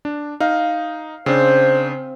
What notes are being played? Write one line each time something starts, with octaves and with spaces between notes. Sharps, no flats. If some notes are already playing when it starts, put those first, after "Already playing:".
D4
D#4 F5
C#3 C4 D4 C5